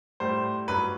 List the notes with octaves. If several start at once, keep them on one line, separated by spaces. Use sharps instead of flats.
A2 G3 C5
G2 F#3 B4